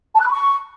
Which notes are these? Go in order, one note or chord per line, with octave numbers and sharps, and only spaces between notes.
A5
F#6
B5
C#6